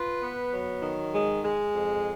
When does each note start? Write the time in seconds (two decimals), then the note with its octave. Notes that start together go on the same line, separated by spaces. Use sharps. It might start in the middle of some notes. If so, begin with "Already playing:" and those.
Already playing: F4 B4
0.22 B3
0.52 F#3
0.82 D#3
1.13 G#3
1.43 G#3
1.74 F2